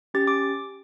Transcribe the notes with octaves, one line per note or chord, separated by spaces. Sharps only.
C#4 G4 A6
D6